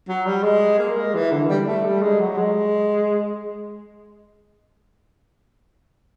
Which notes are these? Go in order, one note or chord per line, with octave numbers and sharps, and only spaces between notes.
F#3
G3
G#3
A#3
G#3
E3
D3
G3
A3
G3
G#3
F#3
G#3